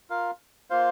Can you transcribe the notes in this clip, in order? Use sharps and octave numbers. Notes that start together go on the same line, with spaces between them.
F4 A#4 F5
A#3 F4 C5 F5